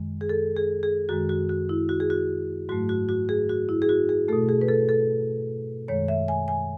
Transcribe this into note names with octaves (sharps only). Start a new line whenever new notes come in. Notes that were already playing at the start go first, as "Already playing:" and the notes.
Already playing: F#2 D#3 G#3
G#4
A4
G#4
G#4
F#2 D#3 G#3 F#4
F#4
F#4
E4
F#4
G#4
F#4
G#2 F#3 A3 F#4
F#4
F#4
G#4
F#4
E4
G#4
F#4
G#4
B2 A3 A4
G#4
B4
A4
A4
F#2 D#3 G#3 C#5
E5
G#5
G#5